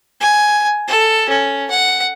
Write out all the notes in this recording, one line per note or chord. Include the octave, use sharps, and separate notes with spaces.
G#5
A4
C#4
F#5